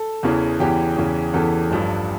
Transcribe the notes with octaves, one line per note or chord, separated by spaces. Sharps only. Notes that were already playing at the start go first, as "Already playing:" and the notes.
Already playing: A4
E2 C#3 E3
E2 C#3 E3 G4
E2 C#3 E3
E2 C#3 E3 A4
A1 G2 F3